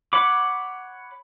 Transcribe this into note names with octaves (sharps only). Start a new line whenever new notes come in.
C#5 F#5 B5 D6